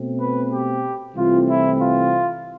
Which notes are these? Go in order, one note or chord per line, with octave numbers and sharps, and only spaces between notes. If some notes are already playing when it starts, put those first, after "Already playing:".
Already playing: B2 A3 C4
B4
G4
C2 C3 E3 A3 C4 F4
E4
F4